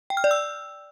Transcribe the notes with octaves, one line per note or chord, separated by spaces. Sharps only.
G5
F6
D5
E6